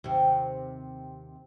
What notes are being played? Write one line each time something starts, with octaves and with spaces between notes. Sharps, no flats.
D#2 C3